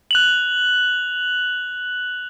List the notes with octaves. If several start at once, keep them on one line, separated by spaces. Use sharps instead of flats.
F#6 F7 F#7